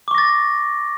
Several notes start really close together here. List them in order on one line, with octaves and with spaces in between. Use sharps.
D6 C#6 A#6 A6